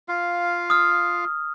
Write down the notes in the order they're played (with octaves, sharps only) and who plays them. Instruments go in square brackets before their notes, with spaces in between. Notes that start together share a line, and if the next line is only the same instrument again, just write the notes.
[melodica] F4 F5
[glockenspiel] D#6 F6